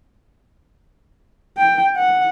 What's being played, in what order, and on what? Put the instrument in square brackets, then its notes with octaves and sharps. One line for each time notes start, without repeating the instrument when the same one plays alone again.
[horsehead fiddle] G5
F#5